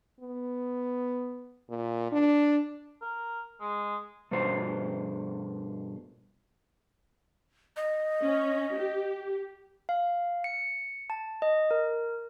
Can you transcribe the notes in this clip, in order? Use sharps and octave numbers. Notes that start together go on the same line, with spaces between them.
B3
A#2
D4
A#4
G#3
G2 B2 C5
D#5
C#4
G4
F5
C#7
A5
D#5
A#4